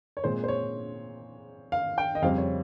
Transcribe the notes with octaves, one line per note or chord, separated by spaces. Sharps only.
C#5
A#2 G#3 C4 C5
C5
C#5
F5
G5
D#5
F2 C#3 G3 C4 F5
C#5